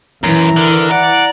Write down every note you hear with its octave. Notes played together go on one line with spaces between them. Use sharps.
F#2 E3 A#5
D3 A#4
D5 F#5